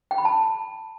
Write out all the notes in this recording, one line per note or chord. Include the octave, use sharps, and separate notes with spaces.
G5
B5
A5